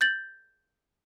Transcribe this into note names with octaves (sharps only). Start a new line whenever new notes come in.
G6 A6 F#7